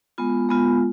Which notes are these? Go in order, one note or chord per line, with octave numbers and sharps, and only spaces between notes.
G#3 B3 F4
G#3 B3 F4